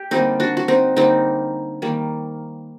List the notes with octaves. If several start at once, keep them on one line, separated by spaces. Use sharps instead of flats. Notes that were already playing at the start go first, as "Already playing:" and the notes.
Already playing: G4
D3 G3 A#3 C4 D#4
D4 F#4
F#4
C4 D#4
D3 G3 A#3 C4 D#4
D#3 G3 A#3